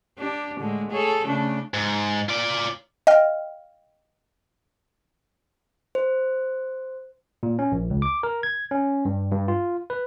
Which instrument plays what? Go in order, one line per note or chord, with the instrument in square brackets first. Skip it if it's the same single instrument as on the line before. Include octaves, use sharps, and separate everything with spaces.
[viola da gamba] D4 G4
A2 D3 G#3
G#4 A4 C#5
C#3 A3 D4
[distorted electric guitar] G#2
F4 D5
[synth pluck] D#5 F5 G5 F6
[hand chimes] C5
[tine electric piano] A#2
C#4
A#1
C#2
D6
A#4
G#6
C#4
G2
G2
F4
B4